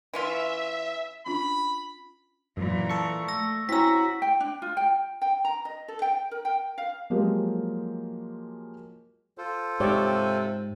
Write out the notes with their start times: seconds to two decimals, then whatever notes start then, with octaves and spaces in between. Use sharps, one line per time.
0.14 E3 C#4 F4 E5
1.26 C#4 D4 F4 B5
2.57 F#2 A#2 E3
2.89 A4 C#6
3.28 A3 E6 A#6
3.69 C4 C#4 E4 F#4 A#5 E6 B6
4.22 G5
4.40 D4
4.62 F4
4.77 G5
5.22 G5
5.45 A#5
5.65 D#5
5.88 A4
6.02 G5
6.31 A#4
6.45 G5
6.78 F5
7.10 F3 F#3 G#3 A#3 G4 A#4
9.38 F4 A4 C5
9.80 G#2 C3 G4 C#5 D5